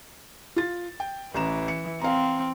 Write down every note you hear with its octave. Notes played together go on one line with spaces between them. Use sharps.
F4 A6
G5
A1 E3 A#5 E7
C#7
C4 F5 A#5